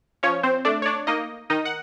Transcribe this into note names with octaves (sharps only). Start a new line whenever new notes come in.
F3 C#4 C#5
C4 C5
A3 D4 D5
C#5
D4 D5
A#3 D#4 D#5
D#3 D#4 D#5
F#5